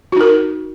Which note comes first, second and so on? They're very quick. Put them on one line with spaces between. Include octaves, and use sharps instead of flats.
F#4 D#4 A#4